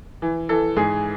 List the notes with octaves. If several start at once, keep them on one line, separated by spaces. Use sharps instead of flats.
E3
E3 A4
G#2 G#4